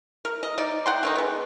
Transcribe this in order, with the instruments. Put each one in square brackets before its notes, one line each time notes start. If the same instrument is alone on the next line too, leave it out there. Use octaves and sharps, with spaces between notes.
[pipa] A#4
D#5
D#4 D5
F#5 G5 C6
D3 D#3 D#4
G#3 B3